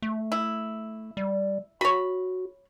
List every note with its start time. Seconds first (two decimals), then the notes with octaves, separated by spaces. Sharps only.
0.02 A3
0.32 E4
1.17 G3
1.81 F#4 C#5 B5